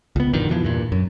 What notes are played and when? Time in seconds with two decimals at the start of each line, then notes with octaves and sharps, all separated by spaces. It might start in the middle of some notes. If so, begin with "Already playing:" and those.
0.16 C#2 B3
0.33 A1 F2 D3 D#3
0.49 F2 B2 E3 F3
0.63 E2 G2 A#2
0.92 F#2